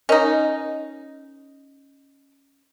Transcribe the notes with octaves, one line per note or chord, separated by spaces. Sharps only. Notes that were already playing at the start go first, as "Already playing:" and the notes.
C#4 D#4 A#4 D#5